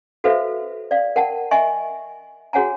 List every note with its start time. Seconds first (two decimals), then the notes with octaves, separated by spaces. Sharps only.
0.24 F#4 A4 B4 C5 E5 F5
0.91 D5 F5
1.16 A#4 F#5 G5 A5
1.51 D#5 E5 G#5 C#6
2.53 F#4 G#4 C#5 F#5 G#5 A#5